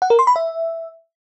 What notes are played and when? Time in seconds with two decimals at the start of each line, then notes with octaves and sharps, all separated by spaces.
0.02 F#5
0.10 A#4
0.19 C6
0.27 B5
0.36 E5